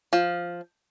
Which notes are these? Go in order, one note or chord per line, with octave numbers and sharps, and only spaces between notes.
F3